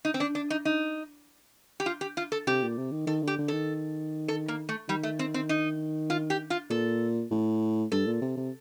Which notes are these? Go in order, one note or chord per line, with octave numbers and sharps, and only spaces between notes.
D#4
C4
D4
D4
D#4
D#4
G4
F4
G4
F4
A4
C3 G4
A#2
C3
D#3
D#3 A4
D3 G4
D3
D#3 A4
A4
A#3
A3
D#3 G3
A3
C4
C4
D#4
F4
G4
F4
A#2 A4
A2
G2 A4
A#2
C3
C3